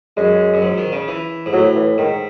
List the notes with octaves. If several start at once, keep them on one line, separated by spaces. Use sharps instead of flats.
F#2 G#3
F#2
G#2
D#3
C#3
E3
G#2
A2 F#3
E3
G#2 D#3